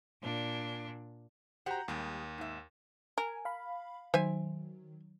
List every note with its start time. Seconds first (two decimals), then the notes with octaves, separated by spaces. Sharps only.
0.20 A#2 D4
1.66 F#4 G4 C5 F#5 A#5
1.88 D#2 G3 G#3 G#4
2.38 G#2 E5
3.18 A#4 G#5
3.45 F5 B5
4.14 D#3 F#3 C5 E5 G#5